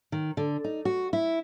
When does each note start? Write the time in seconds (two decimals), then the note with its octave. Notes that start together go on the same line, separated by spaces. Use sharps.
0.12 D#3
0.37 D3
0.64 D#4
0.85 F#4
1.13 E4